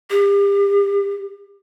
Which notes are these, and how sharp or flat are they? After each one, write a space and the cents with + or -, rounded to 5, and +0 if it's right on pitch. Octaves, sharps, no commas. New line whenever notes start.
G4 +35